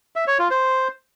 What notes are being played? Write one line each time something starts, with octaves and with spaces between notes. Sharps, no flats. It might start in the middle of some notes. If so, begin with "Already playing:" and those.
E5
C#5
F4
C5